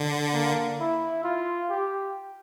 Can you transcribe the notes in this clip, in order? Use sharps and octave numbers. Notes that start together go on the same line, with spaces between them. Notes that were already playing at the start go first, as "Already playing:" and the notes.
Already playing: D3
A#3
E4
F4
G4